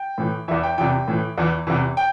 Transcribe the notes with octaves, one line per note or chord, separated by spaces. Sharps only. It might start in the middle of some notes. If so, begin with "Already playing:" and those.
Already playing: G5
A2 E3
E2 E3 E5
G5
E2 C3 E3 G5
A2 E3
E2 E3
E2 C3 E3
G5